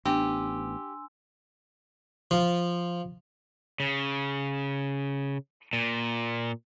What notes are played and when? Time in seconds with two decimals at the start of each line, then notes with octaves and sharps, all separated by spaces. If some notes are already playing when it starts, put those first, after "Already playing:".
0.06 A1 B3 D4 G4 G#5 C6 E6
2.31 F3
3.80 C#3
5.73 A#2